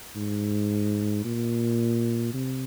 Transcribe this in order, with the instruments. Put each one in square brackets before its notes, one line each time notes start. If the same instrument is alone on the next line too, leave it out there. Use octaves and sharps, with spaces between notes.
[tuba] G#2
A#2
C3